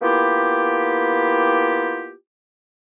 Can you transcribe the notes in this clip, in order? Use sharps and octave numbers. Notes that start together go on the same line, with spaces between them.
A#3 B3 E4 F4 G4